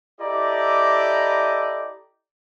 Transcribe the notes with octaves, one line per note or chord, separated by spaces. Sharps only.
E4 G4 A4 D5 D#5 A#5